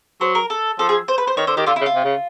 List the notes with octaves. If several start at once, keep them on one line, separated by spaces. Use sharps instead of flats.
F#3 C5
A#4
A4
F3 A4
G#4
C5
B4
C5
D#3 C#5
D3 C5
D#3 G4
D3 F4
E4
C#3
F4
C3
C#3